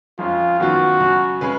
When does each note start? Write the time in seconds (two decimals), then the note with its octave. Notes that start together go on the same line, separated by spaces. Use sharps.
0.19 F2 F3 G#3 C#4 F4
0.60 F#2 D#3 F#3 B3 F4 F#4
1.00 F#2 C#3 F#3
1.41 C#3 G#3 C#4 G#4 B4